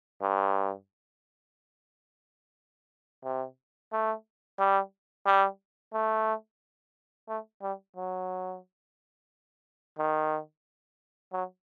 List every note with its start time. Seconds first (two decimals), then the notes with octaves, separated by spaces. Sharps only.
0.22 G2
3.24 C3
3.93 A3
4.59 G3
5.26 G3
5.93 A3
7.28 A3
7.62 G3
7.97 F#3
9.99 D#3
11.33 F#3